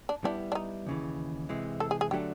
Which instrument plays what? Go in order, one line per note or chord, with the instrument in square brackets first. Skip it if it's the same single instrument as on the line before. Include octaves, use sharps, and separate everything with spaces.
[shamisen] D4
[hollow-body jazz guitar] G3 B3 E4 [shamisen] D4
[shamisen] D4
D#4
[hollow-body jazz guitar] D#2 C#3 E3
C3 E3 G#3
[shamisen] A4
G#4
G#4
[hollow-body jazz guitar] D3 F#3 A3 D4 [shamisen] G4